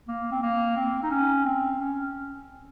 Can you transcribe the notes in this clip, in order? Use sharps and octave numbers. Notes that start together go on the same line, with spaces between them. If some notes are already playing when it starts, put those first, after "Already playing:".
A#3
C4
A#3
C4
D#4
C#4
C4
C#4